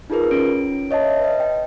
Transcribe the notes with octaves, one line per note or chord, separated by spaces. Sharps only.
D#4 F4 G#4 A#4 B4
C#4 D7
C#5 D#5 E5 A5
B4 D#5
G5